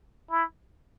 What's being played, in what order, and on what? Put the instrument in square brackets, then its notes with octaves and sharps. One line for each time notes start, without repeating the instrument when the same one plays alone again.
[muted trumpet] E4